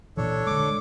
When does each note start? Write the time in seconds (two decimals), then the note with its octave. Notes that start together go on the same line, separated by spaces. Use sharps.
0.17 A#2 E3 D4 A4 C#5
0.47 D3 G#3 D6